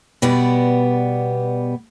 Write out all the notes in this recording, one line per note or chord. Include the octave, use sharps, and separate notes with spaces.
B2 G3 B3 D5